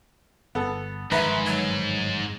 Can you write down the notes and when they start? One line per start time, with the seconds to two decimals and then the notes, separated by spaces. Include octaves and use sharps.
0.55 G1 B3 A4
1.12 G1 F2 G#2 D#3 B4 E5 A#5
1.46 F#3